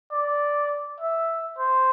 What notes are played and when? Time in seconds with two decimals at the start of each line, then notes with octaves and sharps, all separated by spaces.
0.12 D5
1.00 E5
1.58 C5